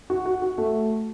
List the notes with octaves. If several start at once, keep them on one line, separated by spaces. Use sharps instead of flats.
F#4
F#4
F#4
A3